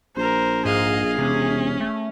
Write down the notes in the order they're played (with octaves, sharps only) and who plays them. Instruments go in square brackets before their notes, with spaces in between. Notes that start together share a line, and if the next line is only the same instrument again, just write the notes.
[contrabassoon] A#1 [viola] A#4 C5
[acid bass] G#2 [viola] G#4 [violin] D#5 F5
[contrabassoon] E1 [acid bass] C3 [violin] C#4
[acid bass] A3